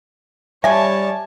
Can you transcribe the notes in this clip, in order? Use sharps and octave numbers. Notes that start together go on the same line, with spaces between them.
F#3 G3 C#5 E5 G#5 A5